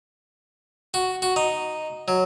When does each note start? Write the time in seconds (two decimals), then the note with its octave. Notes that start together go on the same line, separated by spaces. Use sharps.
0.94 F#4
1.22 F#4
1.36 D#4
2.08 F#3